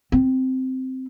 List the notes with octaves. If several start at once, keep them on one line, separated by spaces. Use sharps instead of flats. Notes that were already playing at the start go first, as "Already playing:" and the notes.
C4